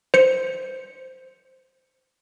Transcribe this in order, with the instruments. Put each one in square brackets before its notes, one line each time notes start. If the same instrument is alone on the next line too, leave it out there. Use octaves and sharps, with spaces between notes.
[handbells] C5 C#7